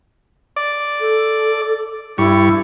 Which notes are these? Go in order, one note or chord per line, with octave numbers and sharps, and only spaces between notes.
D5
A4
G2 E4 C#6